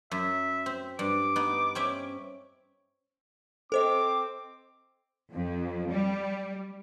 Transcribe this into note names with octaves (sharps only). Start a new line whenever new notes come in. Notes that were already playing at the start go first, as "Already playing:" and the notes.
F#2 E5
C4
G2 D6
B3 D#4
C4 C#4 E5
C4 A4 C5 D#5 D6
F2
G3